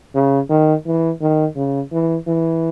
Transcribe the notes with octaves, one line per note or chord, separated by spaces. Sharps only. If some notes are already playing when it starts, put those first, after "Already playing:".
C#3
D#3
E3
D#3
C#3
E3
E3